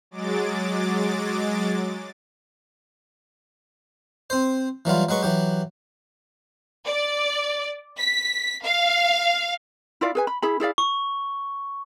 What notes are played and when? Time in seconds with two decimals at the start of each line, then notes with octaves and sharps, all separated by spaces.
0.11 F#3 G#3 D6 A6
4.30 C4 C5
4.85 E3 F#3 G3 F4
5.09 F#3 G#3 B4 C#6
5.23 E3 F#3 G4
6.86 D5
7.98 B6
8.64 F5
10.01 E4 F4 D5 F5
10.15 G#4 B4 G#5
10.27 B5
10.42 E4 G#4 B5
10.60 E4 G#4 D5 F5
10.78 C#6